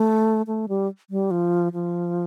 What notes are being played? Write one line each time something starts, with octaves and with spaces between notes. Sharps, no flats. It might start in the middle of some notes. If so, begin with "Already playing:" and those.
Already playing: A3
A3
G3
G3
F3
F3